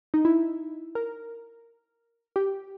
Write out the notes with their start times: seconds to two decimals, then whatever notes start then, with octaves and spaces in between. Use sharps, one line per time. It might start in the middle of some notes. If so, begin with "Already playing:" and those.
0.14 D#4
0.25 E4
0.95 A#4
2.36 G4